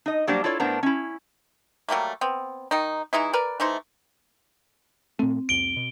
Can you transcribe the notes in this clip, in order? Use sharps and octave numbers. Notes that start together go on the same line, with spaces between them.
D#4 D#5
F#3 G3 A#3 D4 C5 D5
E4 F4 A4 C#5 D5
A2 B3 D4 A#4 C5 A#5
C#4 E4
F#3 G3 A3 A#3
B3 C4
D#3 D#4
E3 G#3 D#4 E4
A#4 B4 D5
E3 A3 D#4 C5
A#2 A3 C4
C2 F2 D7 G7
B2